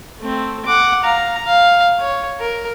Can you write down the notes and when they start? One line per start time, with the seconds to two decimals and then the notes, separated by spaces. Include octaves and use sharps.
0.20 A3 C4
0.66 F#5 D6
1.03 F5 A#5
1.45 F5
2.01 C#5
2.40 A#4